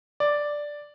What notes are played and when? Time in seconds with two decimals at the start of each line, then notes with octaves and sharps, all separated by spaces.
0.20 D5